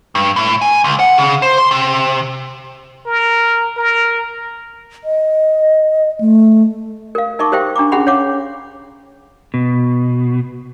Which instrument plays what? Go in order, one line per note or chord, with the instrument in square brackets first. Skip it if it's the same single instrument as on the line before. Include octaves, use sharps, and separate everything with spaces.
[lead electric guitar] G2
A2
G#5
C#2
F#5
C#3
C5
C6
C3
[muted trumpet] A#4
A#4
[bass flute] D#5
A3
[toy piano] A#4 F5
D#4 A#4 E5 A5 C#6 D6
G4 A#4 C5 E5 F5 G5
D4 A#5 C#6 D6
C#4 G#4 E5 F#5 B5 C6
C#5 F5 F#5 D6
[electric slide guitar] B2